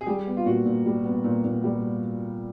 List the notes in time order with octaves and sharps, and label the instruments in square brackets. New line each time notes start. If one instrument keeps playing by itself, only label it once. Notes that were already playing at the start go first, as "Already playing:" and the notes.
[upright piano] G#4
[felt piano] G3 [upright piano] G4
[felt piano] B3
[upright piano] F4
[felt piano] A#2 [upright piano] F#4
[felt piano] A#2
G3
B3
A#2
A#2
G3